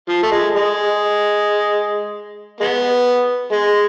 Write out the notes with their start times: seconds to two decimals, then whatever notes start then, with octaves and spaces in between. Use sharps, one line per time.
0.09 F3
0.23 A3
0.32 G#3
0.54 G#3
2.60 G#3 B3
3.52 G#3